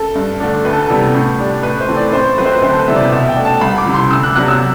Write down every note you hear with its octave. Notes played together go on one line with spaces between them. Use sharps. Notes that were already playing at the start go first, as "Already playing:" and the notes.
Already playing: A4
G2
D3 A3 D4
D2 B4
A4
C3 E3 G3 B3 A4
A2
G3 D4
A2 B4
C5
E3 A3 C4
D5
A2 C5
F#3 C4 B4 C5
B4
D2 C5
A4
B4
C3 E3 G3 B3 E5
D5
B2 E5
G5
A3 D4
A5
C2 B5
D6
C3 E3
C6
D2 E6
F#6
C3 F#3 B3 D4 F#6
E6